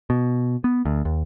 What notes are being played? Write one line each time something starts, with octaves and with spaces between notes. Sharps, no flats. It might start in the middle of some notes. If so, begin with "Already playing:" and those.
B2
B3
D2
D#2